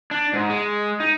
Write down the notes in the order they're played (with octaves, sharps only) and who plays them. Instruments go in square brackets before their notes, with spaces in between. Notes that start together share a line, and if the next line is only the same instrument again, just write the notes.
[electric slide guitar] D4
G#2
G#3
D#4